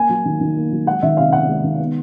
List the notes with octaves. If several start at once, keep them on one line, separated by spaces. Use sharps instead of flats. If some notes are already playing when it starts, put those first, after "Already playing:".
Already playing: A#3 G#5
F#3
D#3
D#3
A#3
F#3
G#3 F#5
D#3 E5
C3 F5
C3 F#5
G#3
D#3
B3